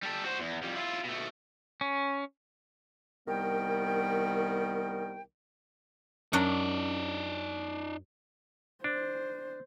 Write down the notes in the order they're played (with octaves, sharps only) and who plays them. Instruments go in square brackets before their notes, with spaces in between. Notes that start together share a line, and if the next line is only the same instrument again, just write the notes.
[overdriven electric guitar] G3 A4
F#4 C5
E2
F2 G3
E4 F4
B2 A3
[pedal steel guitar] C#4
[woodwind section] C2 D#3 G3 B3 A#4 G5
[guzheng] F#2 F#3 D4 [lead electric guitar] D#4 D5
[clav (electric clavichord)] D4 [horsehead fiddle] C5